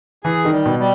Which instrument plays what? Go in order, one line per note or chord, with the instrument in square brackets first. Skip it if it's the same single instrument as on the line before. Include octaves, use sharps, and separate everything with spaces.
[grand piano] E3 [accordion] G#4
[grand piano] D#3
[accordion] G3
[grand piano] B2
[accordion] G3